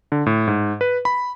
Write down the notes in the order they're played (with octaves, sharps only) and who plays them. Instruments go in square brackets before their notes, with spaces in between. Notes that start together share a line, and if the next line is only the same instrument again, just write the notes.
[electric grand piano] D3
A2
G#2
B4
B5